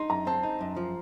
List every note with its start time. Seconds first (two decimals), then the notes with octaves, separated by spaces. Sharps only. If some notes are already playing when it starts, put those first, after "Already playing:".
Already playing: D#4 C6
0.10 F#2 A#5
0.27 C4 A5
0.43 D#4
0.61 F#2
0.77 F3